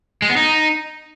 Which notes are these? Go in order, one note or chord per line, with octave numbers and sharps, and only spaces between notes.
G#3
B3
D#4